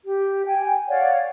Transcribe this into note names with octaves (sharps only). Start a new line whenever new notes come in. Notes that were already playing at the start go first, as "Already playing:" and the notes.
G4
G5 G#5
C#5 D5 F5 F#5